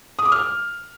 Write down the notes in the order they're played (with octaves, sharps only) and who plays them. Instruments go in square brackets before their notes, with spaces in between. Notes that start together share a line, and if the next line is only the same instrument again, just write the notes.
[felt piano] D#6
D6
F6